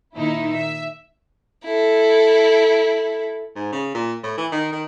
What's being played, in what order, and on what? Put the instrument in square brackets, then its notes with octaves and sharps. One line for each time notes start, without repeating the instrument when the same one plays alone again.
[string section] A#2 D#3 D#4 E4
E5
[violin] E4 A4
[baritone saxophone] G#2
C#3
A#2
A2
E3
D#3
D#3